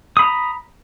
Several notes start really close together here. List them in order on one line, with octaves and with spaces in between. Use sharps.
D#6 B5 A#5